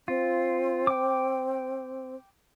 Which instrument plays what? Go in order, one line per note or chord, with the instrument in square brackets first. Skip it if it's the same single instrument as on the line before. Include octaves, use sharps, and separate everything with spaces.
[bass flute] C4 [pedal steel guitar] F4
[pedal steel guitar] G5 D6